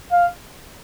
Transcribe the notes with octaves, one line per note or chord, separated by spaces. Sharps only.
F5